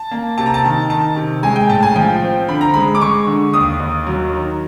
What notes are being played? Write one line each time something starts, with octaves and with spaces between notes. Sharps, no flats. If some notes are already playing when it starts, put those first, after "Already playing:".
Already playing: A5
A#3
C3 A5
A#5
A5
D#3
D#3 A5
C3
G#3 G#5
G5
A2 A5
G#5
F3 G5
C4
D3 B5
A#5
G#3 B5
D6
G#3 C#6
D3
D#2 D#6
D#2
F#3
D#3